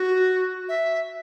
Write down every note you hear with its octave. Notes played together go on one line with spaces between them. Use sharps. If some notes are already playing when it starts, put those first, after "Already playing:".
Already playing: F#4
E5